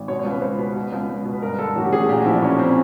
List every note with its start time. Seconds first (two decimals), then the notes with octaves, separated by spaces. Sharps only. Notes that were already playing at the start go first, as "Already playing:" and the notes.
Already playing: G#1
0.08 B2 C#5
0.19 C#5
0.25 C#2
0.30 B4
0.41 C#2 C5
0.58 B2 B4
0.76 B2
0.92 C#2
1.09 C#2
1.25 B2
1.33 B4
1.42 G2 A#4
1.59 D3 A4
1.75 A1 F#4
1.85 G4
1.92 A1 G#4
2.09 A#2 G4
2.18 F#4
2.25 F3 E4
2.34 D4
2.42 B1 C#4
2.59 C4